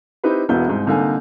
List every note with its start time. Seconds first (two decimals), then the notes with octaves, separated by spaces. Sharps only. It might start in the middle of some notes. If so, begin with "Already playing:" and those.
0.24 C4 D#4 E4 G4 B4
0.49 E1 B1 B3 E4 F#4 G6
0.67 C2 G#2
0.86 C2 D3 A#3 D#4 G#5